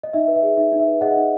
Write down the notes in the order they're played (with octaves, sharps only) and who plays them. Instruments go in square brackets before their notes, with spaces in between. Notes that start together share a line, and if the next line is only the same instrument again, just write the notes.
[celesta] D#5
D#4 E5
B4
E5
G#4
D#4 E5
D#4
E5
B4
G#4 D#5 F#5
D#4